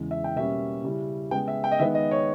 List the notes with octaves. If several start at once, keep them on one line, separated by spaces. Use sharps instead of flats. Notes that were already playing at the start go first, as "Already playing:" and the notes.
Already playing: E2 C#3 E3 G#3
E5
G5
B2 G3 A#3 C#4 E5
C#3 G3 C#4 E4
C#3 G#3 B3 G5
E5
G5
D#5
D#3 G#3 B3 D#4 E5
D#5
C#5